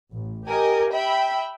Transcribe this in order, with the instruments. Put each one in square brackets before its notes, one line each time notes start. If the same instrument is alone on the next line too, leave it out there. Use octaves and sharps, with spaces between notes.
[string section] A1
G4 A#4 D#5 G#5
E5 G5 B5